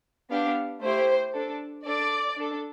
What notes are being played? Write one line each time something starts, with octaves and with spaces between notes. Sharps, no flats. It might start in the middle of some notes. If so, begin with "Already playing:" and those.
B3 D4 G4 F5
A3 E4 G4 C5
D4 A4
D4 A4 D5
D4 A4